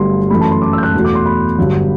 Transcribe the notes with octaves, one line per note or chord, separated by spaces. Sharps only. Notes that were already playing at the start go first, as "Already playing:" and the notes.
Already playing: G1 G2 F#3 A3 C6
F#2 E3 A3 B5
A5
C6
D6
E6
G6
F#6
E2 B2 F#3 A3
D6
C6
B5
G1 G2 D3 F#3